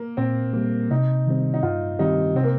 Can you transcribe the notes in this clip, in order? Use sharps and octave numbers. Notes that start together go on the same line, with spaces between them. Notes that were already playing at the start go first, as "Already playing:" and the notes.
Already playing: A#3
A#2 C4
G3 A#3
C3 D#4
D#3 G3 C4
D#4
G2 F4
D#3 G3 C4 D#4 G4
C3 C4
A#3